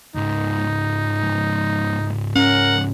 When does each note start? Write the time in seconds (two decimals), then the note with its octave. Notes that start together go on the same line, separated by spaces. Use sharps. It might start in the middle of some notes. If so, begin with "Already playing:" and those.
0.15 C#2 G#2 D#4
2.36 C#4 A#4 F#5